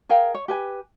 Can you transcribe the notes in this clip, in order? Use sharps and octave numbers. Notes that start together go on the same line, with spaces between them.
G#4 A#4 F5 G5
C#5
G4 B4 G#5